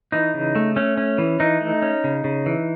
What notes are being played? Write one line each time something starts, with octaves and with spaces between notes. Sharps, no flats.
E3 D#4
C#3
A3
A3 C#4
C#4
E3
E3 D#4
A3
C#4
C#3
C#3
E3